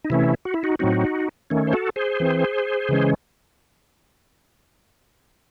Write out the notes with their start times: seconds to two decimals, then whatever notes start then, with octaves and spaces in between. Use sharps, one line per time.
0.04 D#4
0.10 C3 E3 A3 C#4 E4
0.45 F#4
0.54 E4
0.64 D#4 F#4
0.79 A2 F#3 C4 D#4 F#4
1.50 D#3 A3 C#4
1.67 C5
1.73 F#4 A4
1.96 G#4 C5
2.20 E3 C4
2.89 C#3 E3 G#3 C#4